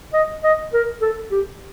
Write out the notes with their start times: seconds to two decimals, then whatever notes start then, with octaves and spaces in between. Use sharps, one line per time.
0.13 D#5
0.44 D#5
0.73 A#4
1.02 A4
1.31 G4